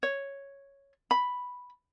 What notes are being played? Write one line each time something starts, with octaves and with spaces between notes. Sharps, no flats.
C#5
B5